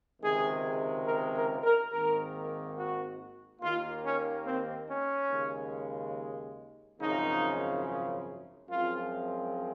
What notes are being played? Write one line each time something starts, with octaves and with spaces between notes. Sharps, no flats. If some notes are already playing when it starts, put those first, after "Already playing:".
C#2 C3 D#3 G#3 G#4
A#4
A#4
A#4
G#1 G#2 D#3 A#3 A#4
F#4
D#2 D#3 A#3 F4
C#4
C4
C#4
D#2 C#3 G#3
G#1 F#2 C#3 F3 D#4
F#2 F3 G#3 C4 F4